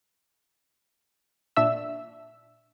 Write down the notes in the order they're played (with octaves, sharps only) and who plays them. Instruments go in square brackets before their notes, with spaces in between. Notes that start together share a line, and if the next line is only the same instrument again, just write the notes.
[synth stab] A#2 D4 E5 E6